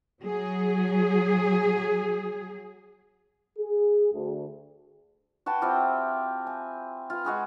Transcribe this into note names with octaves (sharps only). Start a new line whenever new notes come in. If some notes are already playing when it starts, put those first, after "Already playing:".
F#3 G#4
G#4
D2
F#4 B4 G5 A5
C4 E4 F4 G4
G#5
F4 B4
G#3 F#4 G#4 B4